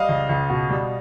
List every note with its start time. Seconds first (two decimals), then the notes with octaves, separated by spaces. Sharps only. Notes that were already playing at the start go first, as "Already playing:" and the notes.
Already playing: G3 D#5 F5
0.09 C#2
0.29 C#2
0.50 B2
0.70 G3